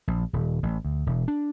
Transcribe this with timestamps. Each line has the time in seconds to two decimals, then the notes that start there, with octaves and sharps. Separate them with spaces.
0.08 A#1
0.33 D#1
0.63 A1
0.85 D2
1.06 E1
1.28 D4